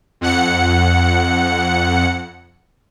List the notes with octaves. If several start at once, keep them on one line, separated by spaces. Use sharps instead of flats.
F2 F#5 C#7